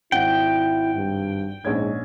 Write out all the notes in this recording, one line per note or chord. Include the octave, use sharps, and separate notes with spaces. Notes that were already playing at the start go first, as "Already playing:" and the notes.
G#1 E4 F#5 G5
G2
A#1 G#2 C#4 G#6